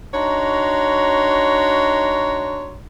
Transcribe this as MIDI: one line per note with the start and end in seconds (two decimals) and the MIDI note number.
0.14 2.76 62
0.14 2.76 63
0.14 2.76 66
0.14 2.76 73
0.14 2.76 82
0.14 2.76 84